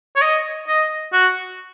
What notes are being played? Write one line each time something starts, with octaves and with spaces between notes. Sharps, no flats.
C#5
D#5
D#5
F#4